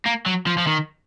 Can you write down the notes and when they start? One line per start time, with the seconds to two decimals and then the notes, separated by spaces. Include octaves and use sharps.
0.06 A#3
0.26 F#3
0.47 F3
0.58 F3
0.67 D#3